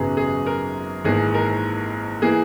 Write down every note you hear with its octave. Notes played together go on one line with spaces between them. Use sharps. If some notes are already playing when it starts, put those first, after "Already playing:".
Already playing: G#1 F#2 C#3 F#3 B3 G#4
G#4
A#4
G#1 G#2 E3 A#3 G#4
A#4
E3 A#3 G#4